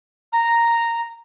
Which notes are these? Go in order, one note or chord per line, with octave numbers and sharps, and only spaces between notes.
A#5